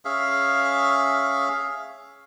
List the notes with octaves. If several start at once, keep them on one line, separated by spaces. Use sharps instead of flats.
C#4 G#4 E5 F5